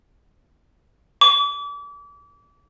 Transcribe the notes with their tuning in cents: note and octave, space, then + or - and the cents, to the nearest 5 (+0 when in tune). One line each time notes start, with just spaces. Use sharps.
D6 -35